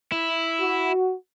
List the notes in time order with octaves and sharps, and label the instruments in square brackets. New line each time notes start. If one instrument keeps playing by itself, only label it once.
[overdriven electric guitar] E4
[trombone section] F#4